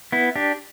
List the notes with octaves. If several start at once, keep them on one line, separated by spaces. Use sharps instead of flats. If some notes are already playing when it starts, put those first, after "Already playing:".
B3 E4
D4 G4